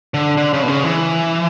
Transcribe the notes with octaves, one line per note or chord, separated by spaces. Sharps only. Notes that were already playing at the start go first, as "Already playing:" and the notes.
D3
D3
C#3
B2
C#3
E3